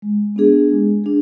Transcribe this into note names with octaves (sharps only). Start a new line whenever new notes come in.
G#3
B3 D4 G#4
G#3
D4 G#4